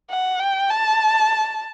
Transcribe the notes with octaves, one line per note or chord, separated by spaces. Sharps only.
F#5
G5
A5